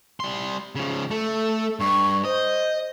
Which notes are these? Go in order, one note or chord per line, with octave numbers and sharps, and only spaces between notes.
G3 C6
C#3 F3
A3 A4
G2 C#6
C5 D#5